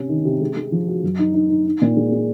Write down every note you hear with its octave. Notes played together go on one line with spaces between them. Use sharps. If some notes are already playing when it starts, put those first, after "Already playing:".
Already playing: C3 C#4
D#3
C3
G#3
G#3
F3
F#4
F#2
D#4
D#4
D#4
D#4
A#2
G#3
G#3